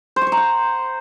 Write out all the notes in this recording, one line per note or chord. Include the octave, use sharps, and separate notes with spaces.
C5
C#6
C5
A#5
F#5